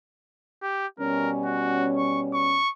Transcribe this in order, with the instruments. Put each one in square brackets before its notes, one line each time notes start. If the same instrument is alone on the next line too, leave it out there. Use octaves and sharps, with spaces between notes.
[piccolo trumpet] G4
[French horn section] B2 G3 C#4 [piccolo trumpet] A#4
[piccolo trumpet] F#4
C#6
C#6